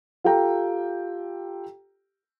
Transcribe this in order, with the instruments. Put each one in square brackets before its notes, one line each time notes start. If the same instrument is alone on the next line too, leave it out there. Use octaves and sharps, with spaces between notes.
[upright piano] F4 G4 A4 G5 A#5